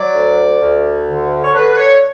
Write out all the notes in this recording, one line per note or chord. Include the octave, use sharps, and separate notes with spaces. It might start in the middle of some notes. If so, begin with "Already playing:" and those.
Already playing: F#3 D5
D2
D2
D3
C#5
D3 B4
B4
C#5